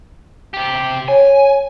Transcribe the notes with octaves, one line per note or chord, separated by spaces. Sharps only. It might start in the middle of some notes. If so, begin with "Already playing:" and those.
C3 G4
C#5 G#5